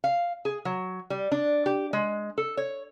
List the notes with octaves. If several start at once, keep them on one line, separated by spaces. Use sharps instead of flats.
F5
G#4
F#3
G3
D4
G4
G#3
A4
C#5